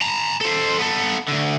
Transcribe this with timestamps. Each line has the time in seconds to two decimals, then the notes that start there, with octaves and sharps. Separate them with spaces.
0.02 A5 A#5
0.41 A4 C5
0.79 B3 A4
1.28 D2 D3